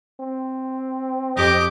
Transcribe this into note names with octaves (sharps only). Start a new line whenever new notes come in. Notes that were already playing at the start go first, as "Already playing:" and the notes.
C4
F2 G4 D#5 D6